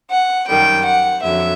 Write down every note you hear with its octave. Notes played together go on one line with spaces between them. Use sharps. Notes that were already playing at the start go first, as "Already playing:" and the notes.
F#5
F#2 D#3 G3 G5
F#5
F2 D3 F#3 E5